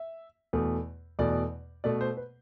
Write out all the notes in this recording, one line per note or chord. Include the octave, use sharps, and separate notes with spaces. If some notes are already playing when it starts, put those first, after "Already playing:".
Already playing: E5
E2 B2 A3
E2 B2 A3 D5
B2 A3 D5
C5
B4